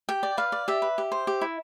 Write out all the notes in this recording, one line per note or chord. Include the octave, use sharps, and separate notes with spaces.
G4 G5
D5
B4 F5
D5
G4 E5
B4
G4
C5
G4
E4